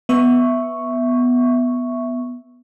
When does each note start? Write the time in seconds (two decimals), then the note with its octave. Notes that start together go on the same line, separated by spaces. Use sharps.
0.09 B3 E5 C#6